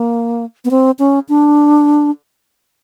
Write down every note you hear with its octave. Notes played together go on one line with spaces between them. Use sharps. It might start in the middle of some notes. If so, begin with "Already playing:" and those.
Already playing: A#3
B3
C4
C#4
D4